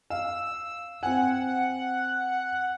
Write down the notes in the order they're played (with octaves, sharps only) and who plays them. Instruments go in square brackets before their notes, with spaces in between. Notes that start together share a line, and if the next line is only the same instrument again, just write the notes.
[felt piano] F5 [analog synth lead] E6
[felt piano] C4 G#5 [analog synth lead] F#5